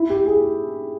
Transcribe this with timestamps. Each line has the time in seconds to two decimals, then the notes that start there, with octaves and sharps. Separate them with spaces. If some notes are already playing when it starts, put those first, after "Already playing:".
Already playing: E4
0.10 G4
0.26 G#4